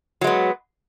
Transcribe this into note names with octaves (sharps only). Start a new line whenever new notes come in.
F#3 G#3 B3